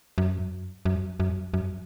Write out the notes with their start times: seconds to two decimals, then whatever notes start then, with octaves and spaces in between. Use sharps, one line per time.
0.18 F#2
0.85 F#2
1.20 F#2
1.54 F#2